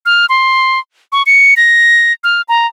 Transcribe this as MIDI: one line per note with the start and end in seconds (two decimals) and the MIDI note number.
0.06 0.26 89
0.29 0.79 84
1.12 1.23 85
1.26 1.54 97
1.57 2.13 94
2.24 2.42 89
2.49 2.67 82